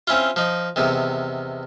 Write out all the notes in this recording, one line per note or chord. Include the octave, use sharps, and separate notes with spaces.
C4 C#4 E4 F4
F3 D#4
E2 C3 D#3